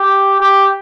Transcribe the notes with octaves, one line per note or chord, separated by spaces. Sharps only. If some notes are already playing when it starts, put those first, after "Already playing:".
Already playing: G4
G4